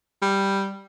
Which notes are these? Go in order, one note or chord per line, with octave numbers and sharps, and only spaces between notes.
G3